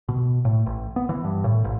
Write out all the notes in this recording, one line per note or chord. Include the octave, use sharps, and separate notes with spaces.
B2
A2
A1
B3
E3
G2
A2
A1